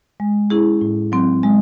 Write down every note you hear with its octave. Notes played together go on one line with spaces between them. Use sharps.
G#3
C#4 E4 G#4
A2
F#3 C4
G#3